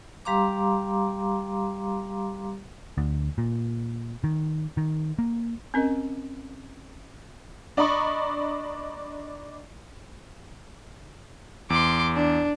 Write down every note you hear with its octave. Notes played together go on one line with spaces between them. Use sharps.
G3 G4 F5 A#5 C6 D6
D2
A#2
D#3
D#3
A#3
C4 C#4 A#4 D#5
D4 D5 D#5 A#5 B5 C#6
E2 C6 D6
D4